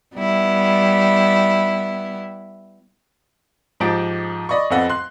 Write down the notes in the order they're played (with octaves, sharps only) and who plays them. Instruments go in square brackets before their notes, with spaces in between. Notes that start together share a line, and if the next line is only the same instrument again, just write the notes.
[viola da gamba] G3 B3 E4
[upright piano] G#2 F3 G4 D#5 A5 D7
D5 D#5 B5 C#6
F2 B3 C4 A4 D#5 F#5
C6 F#6